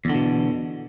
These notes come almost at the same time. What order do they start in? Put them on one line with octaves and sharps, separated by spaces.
E2 D3 B2